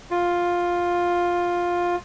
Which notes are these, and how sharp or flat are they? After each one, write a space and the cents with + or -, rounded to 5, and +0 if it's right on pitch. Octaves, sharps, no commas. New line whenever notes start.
F4 +10